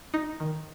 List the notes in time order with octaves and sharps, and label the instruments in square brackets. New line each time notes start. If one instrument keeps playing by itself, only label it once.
[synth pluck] D#4
D#3